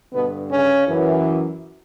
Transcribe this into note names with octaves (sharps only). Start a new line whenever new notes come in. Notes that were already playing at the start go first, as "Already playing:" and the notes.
G2 B2 D3 B3
C#3 C#4
F#2 E3